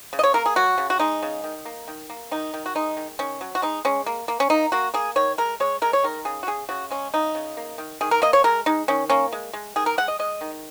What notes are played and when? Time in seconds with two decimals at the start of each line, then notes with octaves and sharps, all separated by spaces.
0.13 C#3
0.19 D#5
0.23 C#5
0.34 A#3 A#4
0.46 G#4
0.56 F#3 F#4
0.78 C#3
0.90 F#4
0.99 G#3 D#4
1.22 C#3
1.44 D#3
1.65 A#3
1.88 D#3
2.10 A#3
2.31 D#3 D#4
2.54 D#3
2.66 F#4
2.75 G#3 D#4
2.97 D#3
3.19 D#3 C#4
3.41 F#3
3.55 F#4
3.62 G#3 D#4
3.85 G#3 C#4
4.06 A#3
4.28 A#3
4.40 C#4
4.50 A#3 D#4
4.72 A#3 F#4
4.94 A#3 G#4
5.16 D#3 C#5
5.38 G#3 A#4
5.60 G#3 C#5
5.82 G#3 A#4
5.93 C#5
6.04 D#3 A#4
6.25 C#3 G#4
6.43 F#4
6.47 C#3 G#4
6.69 C#3 F#4
6.91 G#3 C#4
7.14 C#3 D#4
7.35 C#3
7.57 A#3
7.78 D#3
8.01 D#3 G#4
8.11 A#4
8.22 A#3 D#5
8.33 C#5
8.44 G#3 A#4
8.66 G#3 D#4
8.88 D#3 C#4
9.10 A#3 C#4
9.32 G#3
9.53 G#3
9.76 D#3 G#4
9.86 A#4
9.98 G#3 F#5
10.08 D#5
10.19 G#3 D#5
10.41 D#3